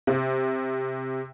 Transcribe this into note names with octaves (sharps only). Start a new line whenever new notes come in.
C3